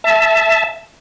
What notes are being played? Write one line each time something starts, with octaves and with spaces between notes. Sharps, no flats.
E5 A5